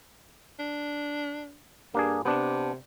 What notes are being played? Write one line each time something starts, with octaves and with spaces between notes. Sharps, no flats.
D4
G2 A#3 D4 G#4
C3 B3 D4